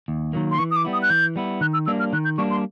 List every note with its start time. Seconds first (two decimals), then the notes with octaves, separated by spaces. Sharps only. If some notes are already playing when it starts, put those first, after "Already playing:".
0.08 D#2
0.33 D#3 F#3 A#3
0.51 C6
0.58 E3 C#6
0.71 D#6
0.76 D6
0.85 G3 B3 E4
0.93 D#6
1.02 F#6
1.10 E3 G6
1.36 G3 B3 E4
1.61 D#3 F#6
1.73 E6
1.86 G3 A#3 D4 E6
2.00 F6
2.13 D#3 F#6
2.25 G6
2.37 G3 A#3 D4 C#6
2.50 C6